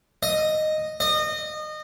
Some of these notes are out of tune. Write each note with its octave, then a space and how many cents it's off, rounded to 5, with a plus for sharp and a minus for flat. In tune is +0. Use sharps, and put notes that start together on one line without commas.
D#5 -5
D#5 -25